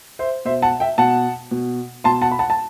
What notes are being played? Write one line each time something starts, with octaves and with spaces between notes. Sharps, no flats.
C5 E5
B2 C5 E5
F#5 A5
E5 G5
B2 F#5 A5
B2
B2 A5 C6
F#5 A5
B5
F#5 A5
A5